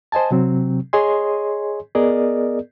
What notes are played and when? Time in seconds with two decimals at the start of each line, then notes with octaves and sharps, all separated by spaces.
0.12 C5 D#5 G#5 A5
0.31 C3 F#3 C4
0.93 G#4 C#5 D#5 G#5 C6
1.95 B3 G#4 A#4 D5 D#5